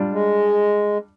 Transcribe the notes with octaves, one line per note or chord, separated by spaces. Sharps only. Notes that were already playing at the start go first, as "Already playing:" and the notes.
Already playing: G3 D4 F4
G#3